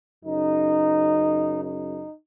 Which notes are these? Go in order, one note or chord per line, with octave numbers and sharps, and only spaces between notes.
F#2 C#3 D#4
D#4